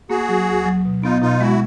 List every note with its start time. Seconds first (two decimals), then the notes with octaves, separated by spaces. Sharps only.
0.10 A#3 F#4 G#4
0.29 F#3
0.48 D2
0.66 F#3
0.85 B2
1.04 B3 D#4 F4
1.22 B2 D#4 F4
1.40 G#3 E4 F#4